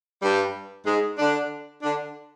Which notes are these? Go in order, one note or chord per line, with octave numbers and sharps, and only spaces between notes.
G2 G3
G#2 G#3
D3 D4
D3 D4